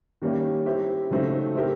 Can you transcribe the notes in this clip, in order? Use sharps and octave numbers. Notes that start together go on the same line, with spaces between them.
D#3 G3 A#3 C#4 E4
C4 E4 G4
C#3 F#3 A3 C4 D#4
C4 E4 G4 A#4